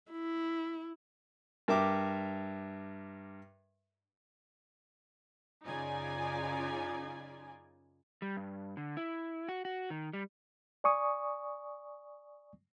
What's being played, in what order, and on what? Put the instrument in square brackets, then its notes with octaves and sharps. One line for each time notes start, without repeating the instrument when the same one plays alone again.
[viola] E4
[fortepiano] G2 A#4 E5 G5 D6
[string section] F#2 C#3 D#4 F4 D5 G#5
[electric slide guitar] G3
G2
D3
E4
F#4
F#4
D#3
G3
[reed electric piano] D5 G#5 C#6 D#6